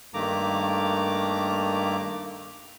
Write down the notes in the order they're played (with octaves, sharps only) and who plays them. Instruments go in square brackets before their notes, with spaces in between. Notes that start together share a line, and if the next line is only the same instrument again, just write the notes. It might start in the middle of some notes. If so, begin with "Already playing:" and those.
[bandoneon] G2 D#3 A3 A#3 A#5 D6